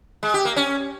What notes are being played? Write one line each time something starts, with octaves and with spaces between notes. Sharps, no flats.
G#3
G4
A#3
C#4